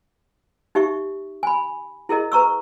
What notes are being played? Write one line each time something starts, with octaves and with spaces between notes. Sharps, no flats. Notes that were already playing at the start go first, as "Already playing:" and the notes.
D#4 G4 E5 C#6
G#5 B5
E4 G#4 A#4 D#5
B4 A#5 C#6 E6